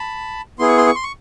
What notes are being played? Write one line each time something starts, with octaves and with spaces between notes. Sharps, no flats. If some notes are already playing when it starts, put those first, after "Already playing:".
Already playing: A5 B5
B3 E4 G#4 C6
C#6
C6
C#6
C6
C#6